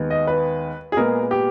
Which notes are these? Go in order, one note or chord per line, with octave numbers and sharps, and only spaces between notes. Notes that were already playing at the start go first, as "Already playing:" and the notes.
Already playing: D#2 D#3 G#3 B3
D#5
B4
G#4
A#2 G#3 B3 A#4
G4